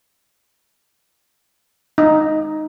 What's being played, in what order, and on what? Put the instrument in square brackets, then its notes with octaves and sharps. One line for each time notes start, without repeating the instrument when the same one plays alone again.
[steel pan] D#4